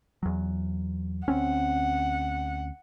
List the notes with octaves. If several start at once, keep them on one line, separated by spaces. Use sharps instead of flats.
E2 F#3
D2 C4 C#4 F#5